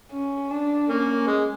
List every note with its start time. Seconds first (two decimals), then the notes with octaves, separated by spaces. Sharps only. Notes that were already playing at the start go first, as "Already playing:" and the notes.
0.12 C#4
0.51 D4
0.89 A#3 C#4
1.27 G#3